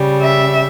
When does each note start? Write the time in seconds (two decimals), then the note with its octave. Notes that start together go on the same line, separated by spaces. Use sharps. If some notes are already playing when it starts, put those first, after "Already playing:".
Already playing: C#3 G3
0.21 E5